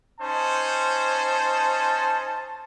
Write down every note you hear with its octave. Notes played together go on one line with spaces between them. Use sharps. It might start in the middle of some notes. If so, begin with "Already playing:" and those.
C#4 D#4 C5 A5